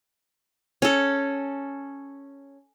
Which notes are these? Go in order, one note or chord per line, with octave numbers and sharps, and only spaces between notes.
C#4 A4